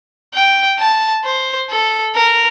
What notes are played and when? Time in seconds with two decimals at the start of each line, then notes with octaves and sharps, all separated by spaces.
0.34 G5
0.79 A5
1.24 C5
1.70 A4
2.15 A#4